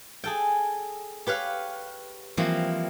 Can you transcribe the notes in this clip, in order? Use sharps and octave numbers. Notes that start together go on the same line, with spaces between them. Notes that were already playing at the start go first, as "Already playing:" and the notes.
G#4 A4 G5
G4 B4 C#5 F5
E3 F3 G3 A#3 C4 E4